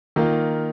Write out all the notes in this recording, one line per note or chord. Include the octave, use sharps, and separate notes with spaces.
D#3 A#3 F4